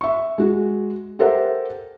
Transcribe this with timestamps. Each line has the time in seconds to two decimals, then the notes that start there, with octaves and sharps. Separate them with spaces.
0.01 E5 C#6
0.38 G#3 F#4
1.19 G4 A4 A#4 C5 E5 F#5